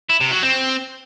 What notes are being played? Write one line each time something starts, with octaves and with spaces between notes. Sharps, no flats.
E4
C3
F#3
C4